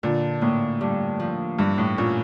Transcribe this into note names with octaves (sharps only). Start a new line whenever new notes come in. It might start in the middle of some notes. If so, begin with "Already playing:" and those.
A#2 D3
A2 A#3
G2
F3
G2 E3
A2
A#2 C#4